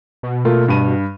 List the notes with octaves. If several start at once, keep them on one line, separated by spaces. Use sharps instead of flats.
B2
A3 A#3 F4
G2 D#7